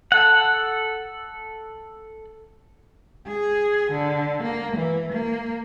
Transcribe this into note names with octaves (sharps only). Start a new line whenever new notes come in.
A4 F#5
G#4
D3
A#3
E3
A#3